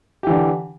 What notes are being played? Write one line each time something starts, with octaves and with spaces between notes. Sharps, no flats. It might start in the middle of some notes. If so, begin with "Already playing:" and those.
D3 E3 G4